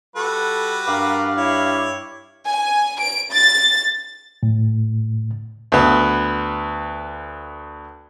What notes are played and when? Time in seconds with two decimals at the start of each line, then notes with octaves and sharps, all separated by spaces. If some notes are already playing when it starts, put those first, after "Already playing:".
0.16 G3 F#4 A4 B4
0.87 G2 A#4 D5 F5
1.37 E4 C#5
2.47 G#5
3.00 D7
3.32 A6
4.43 A2
5.72 D2 B3